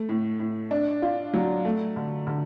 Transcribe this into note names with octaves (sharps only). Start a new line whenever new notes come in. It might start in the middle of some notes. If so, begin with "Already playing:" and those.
Already playing: A3
A2
A2
D4
F4
F#3
A3
D3
D3